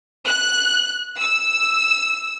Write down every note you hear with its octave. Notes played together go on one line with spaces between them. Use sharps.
F#6
E6